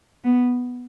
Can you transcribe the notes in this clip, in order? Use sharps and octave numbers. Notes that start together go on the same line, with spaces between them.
B3